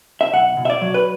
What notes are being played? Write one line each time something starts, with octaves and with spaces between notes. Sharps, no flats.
E5
B1 F#5
B2
E5
D5
F#3
B4